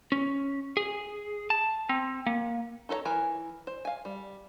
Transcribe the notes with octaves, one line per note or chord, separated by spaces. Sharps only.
C#4
G#4
A5
C4
A#3
D#4 A4 C5 C#5 A#5
E3 A#4 G#5 A#5
C5
F5 G#5
G3